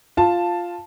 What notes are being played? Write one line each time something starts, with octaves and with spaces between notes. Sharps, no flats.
F4 A5